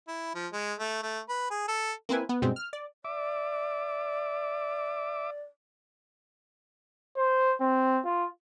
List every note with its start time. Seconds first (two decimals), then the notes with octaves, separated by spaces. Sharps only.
0.07 E4
0.34 F3
0.52 G#3
0.79 A3
1.03 A3
1.29 B4
1.50 G#4
1.68 A4
2.09 A#3 C4 E4 B4 G#5
2.29 B3
2.42 G2 B2 G#3 C4
2.56 F6
2.73 D5
3.05 D5 E5 D6
7.17 C5
7.61 C4
8.05 F4